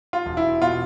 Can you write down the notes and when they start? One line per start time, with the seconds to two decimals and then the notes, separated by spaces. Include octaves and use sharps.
0.13 F4
0.26 E1
0.37 E4
0.62 B2 F4